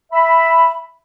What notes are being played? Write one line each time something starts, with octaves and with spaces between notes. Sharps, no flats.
E5 B5